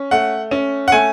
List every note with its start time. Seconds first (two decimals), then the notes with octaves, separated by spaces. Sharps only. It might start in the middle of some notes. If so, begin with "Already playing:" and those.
Already playing: C#4
0.11 A3 F#5
0.51 C#4
0.88 F#5
0.92 A3 G#5